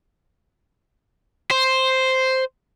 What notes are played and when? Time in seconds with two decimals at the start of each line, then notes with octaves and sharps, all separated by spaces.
1.51 C5